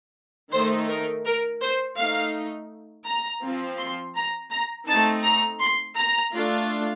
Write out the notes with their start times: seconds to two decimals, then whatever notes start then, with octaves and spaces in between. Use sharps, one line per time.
0.52 D#3 A3 D#4 C5
0.88 A#4
1.24 A#4
1.61 C5
1.97 A3 D#4 F5
3.06 A#5
3.42 F3 C4 F4
3.78 C6
4.15 A#5
4.51 A#5
4.87 A3 C4 D#4 A5
5.23 A#5
5.60 C6
5.96 A#5
6.32 A3 D4 F4